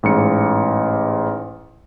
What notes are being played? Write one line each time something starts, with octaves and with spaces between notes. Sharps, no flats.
A1 G#2 C#7